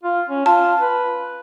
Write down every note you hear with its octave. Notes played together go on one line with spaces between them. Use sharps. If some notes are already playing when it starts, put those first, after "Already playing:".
F4
C#4
F4 A5
B4